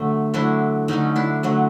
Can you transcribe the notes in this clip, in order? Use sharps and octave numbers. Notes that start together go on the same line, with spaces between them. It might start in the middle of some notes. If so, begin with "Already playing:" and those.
Already playing: D3 F#3 A3
D3 F#3 A3 D4 E4
D3 F#3 A3 C#4 D#4
D4 E4
D3 F#3 A3